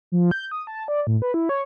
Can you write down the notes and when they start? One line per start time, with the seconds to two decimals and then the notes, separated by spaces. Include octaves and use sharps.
0.12 F3
0.31 G6
0.51 D#6
0.67 A5
0.88 D5
1.07 A2
1.22 B4
1.34 E4
1.49 C#5